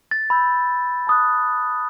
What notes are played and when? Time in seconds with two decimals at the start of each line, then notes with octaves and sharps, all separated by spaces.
0.11 A6
0.30 B5 E6 G6
1.07 A5 D#6 F#6